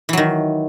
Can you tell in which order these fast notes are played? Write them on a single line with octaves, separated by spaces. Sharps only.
E3 F#3 D#3